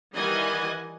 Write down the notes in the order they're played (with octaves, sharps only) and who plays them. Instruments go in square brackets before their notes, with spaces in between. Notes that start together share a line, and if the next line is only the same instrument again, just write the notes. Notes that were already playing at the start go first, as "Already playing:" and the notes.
[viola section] D#3 E3 G3 D#5 F#5 G#5